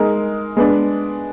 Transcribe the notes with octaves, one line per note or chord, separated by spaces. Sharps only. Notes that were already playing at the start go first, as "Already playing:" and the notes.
Already playing: G#3 D#4 A#4
G#3 B3 D4